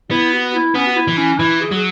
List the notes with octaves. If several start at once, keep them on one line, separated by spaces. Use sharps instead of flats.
B3 E4
F#4
E4
B3 C#4
F#4
E4
E3
C#4
E3 E4
G#4
F#3 G#4